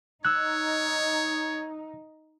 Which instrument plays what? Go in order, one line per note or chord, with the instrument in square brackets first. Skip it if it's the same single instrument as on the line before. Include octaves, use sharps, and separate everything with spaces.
[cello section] D#4 [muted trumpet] C#5 [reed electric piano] E6 F#6